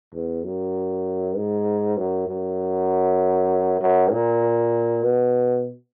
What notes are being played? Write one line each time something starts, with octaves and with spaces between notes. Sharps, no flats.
E2
F#2
G#2
F#2
F#2
F#2
A#2
B2